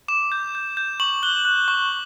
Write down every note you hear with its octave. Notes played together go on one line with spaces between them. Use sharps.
D6 E7
G6
G6
G6
C#6 F#7
F#6 G7
F#6
C#6